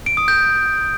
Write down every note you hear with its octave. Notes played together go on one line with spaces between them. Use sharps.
D7
D#6
G6